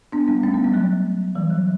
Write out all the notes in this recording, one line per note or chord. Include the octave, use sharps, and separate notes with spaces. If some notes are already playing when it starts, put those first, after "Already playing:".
B3 D4
G3 B3
A3 C#4
G3 B3
G3 B3
F#3 A3
E3 G3
F#3